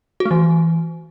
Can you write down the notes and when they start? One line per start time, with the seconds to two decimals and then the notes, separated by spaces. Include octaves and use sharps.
0.20 F#4
0.25 A3
0.31 E3